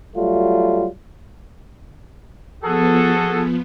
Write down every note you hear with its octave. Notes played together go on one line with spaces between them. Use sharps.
F#3 G3 A3 F4
F3 B3 F#4 G#4 A4